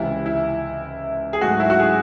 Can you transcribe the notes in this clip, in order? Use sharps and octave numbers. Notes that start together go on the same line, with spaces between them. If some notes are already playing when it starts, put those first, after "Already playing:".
Already playing: C#2 C3 E3 E4
E4
G#4
G#2 F#3 A3 F#4
E4
F#4
G#4